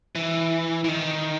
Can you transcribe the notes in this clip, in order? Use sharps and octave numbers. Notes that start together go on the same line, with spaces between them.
E3
E3
D#3